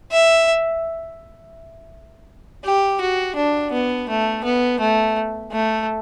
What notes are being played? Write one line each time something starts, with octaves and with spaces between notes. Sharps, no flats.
E5
G4
F#4
D4
B3
A3
B3
A3
A3